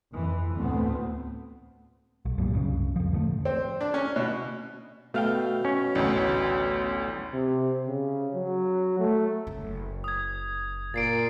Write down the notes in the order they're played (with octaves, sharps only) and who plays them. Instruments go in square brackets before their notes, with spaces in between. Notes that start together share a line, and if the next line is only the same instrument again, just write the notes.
[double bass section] F2 E3
D2 A2 A3 B3 C4
[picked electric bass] B1
F#2 A#2 G3
C2 F#2 C#3
F2 F3
A2 D3 F3 A3
[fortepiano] C4
D4
C#4
B2
[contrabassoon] B2 [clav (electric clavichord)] A3 F5 G5
[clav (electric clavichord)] C#4 C#5
[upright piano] A1 D2
[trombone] C3
C#3
F#3
A3
[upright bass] F#1
[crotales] D#6 G#6
[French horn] A#2 [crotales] A6 C7 D7